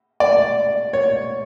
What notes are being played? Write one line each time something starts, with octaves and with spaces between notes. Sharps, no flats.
D5
C#5